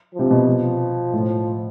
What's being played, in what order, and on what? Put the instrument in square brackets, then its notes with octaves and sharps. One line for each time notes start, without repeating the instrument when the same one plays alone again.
[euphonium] F3
[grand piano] C3
B2
[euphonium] F3
[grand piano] A2